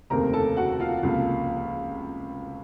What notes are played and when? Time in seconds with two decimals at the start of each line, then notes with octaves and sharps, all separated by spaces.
0.10 F1 D#2 C#3 A3 C4 A#4 A#5
0.33 A4 A5
0.57 F#4 F#5
0.80 F4 F5
1.03 C#2 C3 F3 A#3